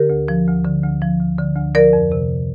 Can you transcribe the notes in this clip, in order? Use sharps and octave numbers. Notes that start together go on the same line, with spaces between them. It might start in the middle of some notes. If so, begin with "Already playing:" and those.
Already playing: D3 G4 A#4
D2
F3
D2
D3
D2
F3
D2
D3
D2
F3 A#4 D5
F2
C3